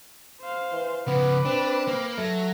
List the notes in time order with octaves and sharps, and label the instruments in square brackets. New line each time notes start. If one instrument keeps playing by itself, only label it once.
[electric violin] C5 F5
[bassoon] E3
[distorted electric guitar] C#3 F3 [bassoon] B3 [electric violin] B4 D6
[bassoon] C4 [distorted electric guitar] D4
[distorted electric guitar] A#3
[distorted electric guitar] F#3 [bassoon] A3 [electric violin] A#6